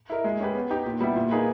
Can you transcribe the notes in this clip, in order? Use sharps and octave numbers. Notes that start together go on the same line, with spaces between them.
E4 A#4 D#5
G#3
C#4 G4 B4
B3
D#4 G4
A#2
G3 B3 E4
A#2
A#3 D#4 G#4 B4